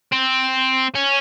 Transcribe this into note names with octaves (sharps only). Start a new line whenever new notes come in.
C4
C#4